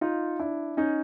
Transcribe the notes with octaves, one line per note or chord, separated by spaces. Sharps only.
D#4 F4
D4 E4
C#4 D#4